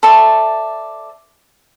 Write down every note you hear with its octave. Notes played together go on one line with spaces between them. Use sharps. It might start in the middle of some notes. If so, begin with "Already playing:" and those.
A4 C5 D5 E5